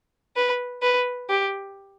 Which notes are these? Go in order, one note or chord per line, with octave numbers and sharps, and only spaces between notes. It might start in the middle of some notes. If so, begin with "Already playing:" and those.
B4
B4
G4